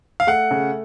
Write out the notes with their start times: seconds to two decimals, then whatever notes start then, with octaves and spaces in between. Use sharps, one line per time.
0.20 F5
0.27 A3 F#5
0.51 C#3